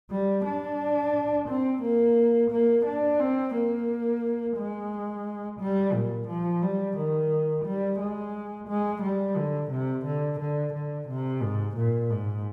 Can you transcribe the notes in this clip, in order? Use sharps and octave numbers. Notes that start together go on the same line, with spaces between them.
G3
D4
C4
A#3
A#3
D4
C4
A#3
G#3
G3
A#2
F3
G3
D#3
G3
G#3
G#3
G3
D3
C3
D3
D3
D3
C3
G#2
A#2
G#2